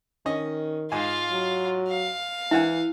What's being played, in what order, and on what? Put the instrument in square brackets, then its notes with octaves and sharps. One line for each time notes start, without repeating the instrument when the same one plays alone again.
[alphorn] D#3 [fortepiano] C#4 D#5
[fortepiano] G#2 G#5 [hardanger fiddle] F4 F5
[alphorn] F#3
[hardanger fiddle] F5
[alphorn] E3 [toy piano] E4 [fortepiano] E5 F#5 G#5